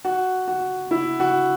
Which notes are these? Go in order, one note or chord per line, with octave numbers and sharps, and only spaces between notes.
F#4
F#4
E4
F#4